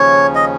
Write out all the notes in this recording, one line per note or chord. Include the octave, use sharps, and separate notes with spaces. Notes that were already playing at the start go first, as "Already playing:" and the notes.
Already playing: D#2 C#3 F3 C#4 C#5
D#5